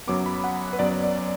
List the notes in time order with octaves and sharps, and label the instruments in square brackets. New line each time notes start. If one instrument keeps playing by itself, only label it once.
[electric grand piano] F#2 F#3 B3 D6
B5
F#5
B4
F#2 F#3 B3 D5
D5